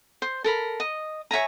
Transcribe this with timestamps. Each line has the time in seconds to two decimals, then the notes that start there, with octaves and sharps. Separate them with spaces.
0.22 C5
0.44 A4 A#4 B5
0.80 D#5
1.31 C#5 E5 G#5 A#5